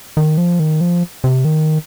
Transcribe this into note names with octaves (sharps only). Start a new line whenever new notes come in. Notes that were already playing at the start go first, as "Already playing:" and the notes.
D#3
F3
D#3
F3
C3
D#3